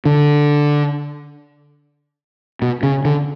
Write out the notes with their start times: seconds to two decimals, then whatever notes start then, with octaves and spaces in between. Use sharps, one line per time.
0.05 D3
2.62 B2
2.83 C#3
3.05 D3